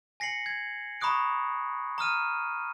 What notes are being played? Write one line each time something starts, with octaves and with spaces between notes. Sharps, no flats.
G#5 A#6 C7 C#7 F#7
G#6
A#5 B5 C#6 D#6 F#6 D7
A#5 D#6 F6 D#7